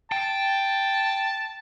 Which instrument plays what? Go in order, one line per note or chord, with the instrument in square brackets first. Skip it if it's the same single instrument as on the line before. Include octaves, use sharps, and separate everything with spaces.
[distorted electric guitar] G5 [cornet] A5